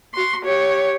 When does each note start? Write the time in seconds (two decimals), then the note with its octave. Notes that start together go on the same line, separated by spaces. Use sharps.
0.14 F#4 C6
0.45 G4 C#5